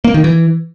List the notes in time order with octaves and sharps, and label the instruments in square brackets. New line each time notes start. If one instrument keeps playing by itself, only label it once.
[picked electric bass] A#3
D#3
E3